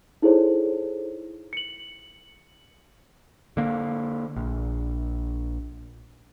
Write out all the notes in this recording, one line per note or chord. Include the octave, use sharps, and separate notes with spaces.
D#4 E4 G#4 A4 C5 C#5
C#7 F#7
D3 A#3
A#1